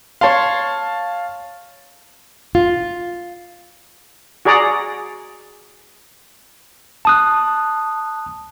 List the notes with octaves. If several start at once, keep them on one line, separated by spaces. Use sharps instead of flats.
C#5 F5 A5 C6
F4
F#4 G#4 D5 A#5
A5 D#6 F#6